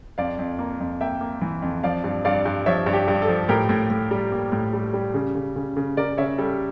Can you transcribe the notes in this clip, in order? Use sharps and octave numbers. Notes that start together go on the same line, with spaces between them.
F2 D5 F5
F2
A#3
F2
A#3 E5 G5
A#3
E3
F2
F3 D5 F5
G2
G2 D5 F5
G2
F3 C#5 E5
G2
G4
G2
A4
F3
A2 G4 A#4
A2
A2
G3
A#3
A2
G3
G3
C#3
C#3
C#3
C#3
C#3 A#4 D5
C#3 C#5 E5
G3 A4